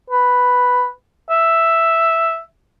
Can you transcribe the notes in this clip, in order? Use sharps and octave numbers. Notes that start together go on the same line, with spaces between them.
B4
E5